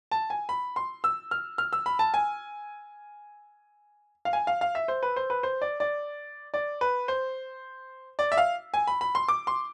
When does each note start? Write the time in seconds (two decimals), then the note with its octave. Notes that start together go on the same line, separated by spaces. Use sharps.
0.11 A5
0.30 G#5
0.49 B5
0.76 C6
1.04 E6
1.31 F6
1.58 F6
1.73 E6
1.86 B5
1.99 A5
2.14 G#5
4.25 F5
4.33 G#5
4.47 F5
4.61 F5
4.75 E5
4.88 C5
5.03 B4
5.16 C5
5.30 B4
5.43 C5
5.62 D5
5.80 D5
6.54 D5
6.81 B4
7.08 C5
8.19 D5
8.32 E5
8.38 F5
8.74 G#5
8.87 B5
9.01 B5
9.15 C6
9.28 D6
9.47 C6